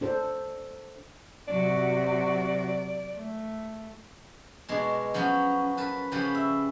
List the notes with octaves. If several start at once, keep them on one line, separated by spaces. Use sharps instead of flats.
D4 A4 C5
C3 F#3 F#4 D5
A3
B2 G#3 D4
F3 F#3 B3 C#4
A#4 B4 A5
C#3 F3 G3 C#4 B4
E5